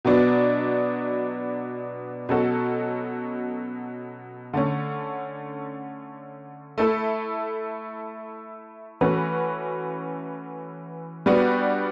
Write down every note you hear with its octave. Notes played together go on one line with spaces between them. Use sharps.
B2 F#3 B3 D4
B2 F#3 C#4 F#4 A4
D3 A3 C#4
A3 E4 A4
E3 A3 C#4 F#4 B4
G3 B3 D4 F#4